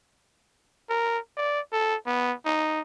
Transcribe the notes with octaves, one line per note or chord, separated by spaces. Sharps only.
A#4
D5
A4
B3
D#4